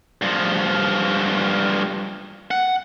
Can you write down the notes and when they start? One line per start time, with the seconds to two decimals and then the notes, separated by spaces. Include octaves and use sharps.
0.21 G2 F3
2.51 F#5